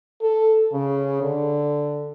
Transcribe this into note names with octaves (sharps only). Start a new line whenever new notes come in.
A4
C#3
D3